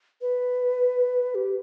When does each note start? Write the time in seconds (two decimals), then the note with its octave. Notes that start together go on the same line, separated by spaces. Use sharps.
0.22 B4
1.35 G4